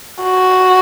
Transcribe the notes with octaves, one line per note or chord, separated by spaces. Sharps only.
F#4